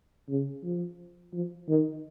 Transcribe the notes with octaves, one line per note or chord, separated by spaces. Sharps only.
C#3
F3
F3
D#3